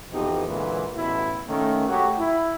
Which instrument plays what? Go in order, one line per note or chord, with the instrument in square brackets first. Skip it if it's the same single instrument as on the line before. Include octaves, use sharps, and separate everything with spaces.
[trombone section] F2 B2 E3 D#4 G4
A#2 D3 E3 F#3 G#3
A1 B2 E4
D#3 A3 A#3 C#4
F#3 A3 F#4 G4
E4